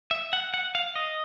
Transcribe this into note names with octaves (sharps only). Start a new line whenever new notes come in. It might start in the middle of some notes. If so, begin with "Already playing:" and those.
E5
F#5
F#5
F5
D#5